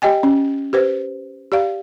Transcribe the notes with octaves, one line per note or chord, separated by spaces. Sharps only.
G4 D#5 G5 G#5
C#4
G4 B4 C5
G4 D5 F5